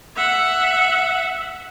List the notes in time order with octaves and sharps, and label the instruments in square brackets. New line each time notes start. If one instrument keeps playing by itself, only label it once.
[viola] E5 F#5